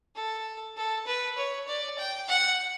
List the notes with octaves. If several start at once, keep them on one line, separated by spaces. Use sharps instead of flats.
A4
A4
B4
C#5
D5
G5
F#5